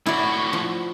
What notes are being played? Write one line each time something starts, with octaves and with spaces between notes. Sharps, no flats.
A2 E4 F#4 D5
F3